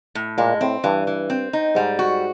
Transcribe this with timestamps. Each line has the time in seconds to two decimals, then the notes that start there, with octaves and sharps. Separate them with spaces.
0.15 A2
0.38 A#2 G#3
0.61 A2 C4
0.84 G2 E3
1.07 E3
1.30 C4
1.53 D#4
1.75 G#2 G3
1.99 F#4